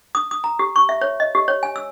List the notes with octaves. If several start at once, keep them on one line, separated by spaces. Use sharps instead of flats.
D#6
D#6
A#5
G4
C#6
E5
C#5
D#5
G4
C#5
G#5
E6